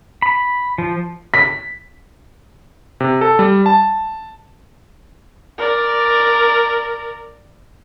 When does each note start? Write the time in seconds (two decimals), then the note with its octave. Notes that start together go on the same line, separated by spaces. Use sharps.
0.22 B5
0.78 F3
1.34 B6
3.00 C3
3.21 A4
3.39 G3
3.66 A5
5.58 A#4 D5